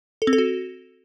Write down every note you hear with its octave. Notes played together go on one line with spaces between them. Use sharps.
A4
C4
A4
F#4